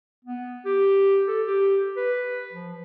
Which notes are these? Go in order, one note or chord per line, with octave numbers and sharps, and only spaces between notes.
B3
G4
A4
G4
B4
F3